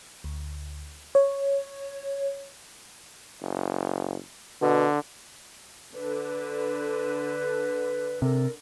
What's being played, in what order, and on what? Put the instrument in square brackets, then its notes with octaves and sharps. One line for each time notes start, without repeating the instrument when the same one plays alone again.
[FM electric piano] D2
C#5
[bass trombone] F#1
[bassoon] B2 [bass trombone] D3
[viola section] D3 [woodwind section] B4
[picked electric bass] C3 [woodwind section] A4 A#4